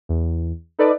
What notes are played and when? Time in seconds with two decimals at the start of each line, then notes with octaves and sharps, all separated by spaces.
0.09 E2
0.79 D#4 A4 B4 D5